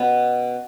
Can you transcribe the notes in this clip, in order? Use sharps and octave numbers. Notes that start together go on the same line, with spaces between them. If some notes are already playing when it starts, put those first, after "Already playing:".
Already playing: B2 B3 C#4